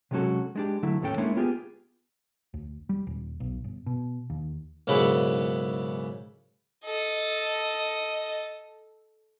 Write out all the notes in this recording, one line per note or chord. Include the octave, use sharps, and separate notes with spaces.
C3 F#3 G#3 C#4 F#4 A4
G#3 D4 G4
D3 F#3 A3 E4
D#2 A2 A3 C#4 A4 G5
G#3 A#3 C#4 D4 E4
B3 F4 G4 G#4
D2
G3
D#1
B1
G1
B2
D#2
B1 G#2 C#3 A#3 E4 F#5
A4 D#5